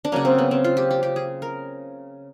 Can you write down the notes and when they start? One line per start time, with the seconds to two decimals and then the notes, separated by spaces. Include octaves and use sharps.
0.05 D4
0.12 C#3 F#3 A#3 C#4
0.25 C4
0.38 B3
0.51 C4
0.64 F4
0.77 G4
0.91 G4
1.03 G4
1.16 G#4
1.42 A#4